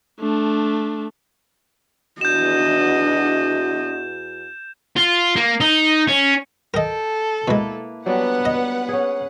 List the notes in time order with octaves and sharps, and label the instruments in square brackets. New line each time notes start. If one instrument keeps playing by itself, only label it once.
[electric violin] A3 D4
[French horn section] E2 F#4 [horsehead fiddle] D4 D#5 [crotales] G6 E7
[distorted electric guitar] F4
A#3
D#4
C#4
[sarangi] A4 [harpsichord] A#4 D#5 [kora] G5
[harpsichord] B2 G#3 [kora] A#3 E4 B4
[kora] F#3 G3 D4 [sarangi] B3 [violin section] B4 F#5
[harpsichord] D#5
[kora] C#4 G#4